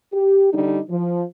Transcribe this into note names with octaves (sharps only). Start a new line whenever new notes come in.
G4
D3 G3 D4 D#4
F3